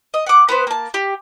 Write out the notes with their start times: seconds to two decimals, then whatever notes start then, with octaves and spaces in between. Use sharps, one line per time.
0.14 D#5
0.26 F#5 D6
0.49 B3 B4 C5
0.67 A#3 A5
0.94 G4